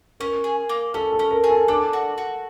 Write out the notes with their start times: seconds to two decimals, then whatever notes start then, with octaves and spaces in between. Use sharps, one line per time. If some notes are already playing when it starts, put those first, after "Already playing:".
0.20 C#4 A#4
0.44 G#4
0.69 A#3
0.94 C#4 A4
1.12 A4
1.19 C#4
1.31 A#4
1.44 G#4
1.50 A4
1.68 D4 A4
1.93 F#4
2.18 F#4